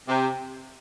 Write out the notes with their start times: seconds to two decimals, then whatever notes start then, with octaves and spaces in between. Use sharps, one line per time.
0.08 C3